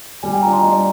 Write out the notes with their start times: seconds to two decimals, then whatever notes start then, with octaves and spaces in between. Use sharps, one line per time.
0.23 G3 G#5
0.33 G5
0.42 F4 A#5
0.47 D4
0.53 C6
0.62 G3 D#5
0.73 D5